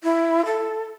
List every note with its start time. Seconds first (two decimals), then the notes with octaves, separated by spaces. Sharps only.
0.04 E4
0.46 A4